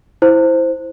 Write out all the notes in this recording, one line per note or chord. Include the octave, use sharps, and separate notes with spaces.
E4 C5